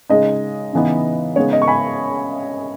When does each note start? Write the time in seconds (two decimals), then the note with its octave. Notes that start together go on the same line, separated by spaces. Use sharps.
0.10 C#3 G#3 D#4 D#5
0.73 C#3 E3 B3 D#4
1.36 C#3 G#3 B3 D#4 C#5
1.53 D#5
1.62 C#6
1.68 G#5 B5